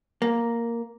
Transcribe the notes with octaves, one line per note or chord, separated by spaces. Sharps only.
A#3